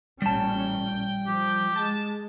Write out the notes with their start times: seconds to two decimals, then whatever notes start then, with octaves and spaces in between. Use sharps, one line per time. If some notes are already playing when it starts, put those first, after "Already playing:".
0.22 A1 A#2 G3 C#4 G5 A5
1.27 F3 G4
1.75 G#3 A5